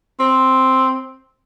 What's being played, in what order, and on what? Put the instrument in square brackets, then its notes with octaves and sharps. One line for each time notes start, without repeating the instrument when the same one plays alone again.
[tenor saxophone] C4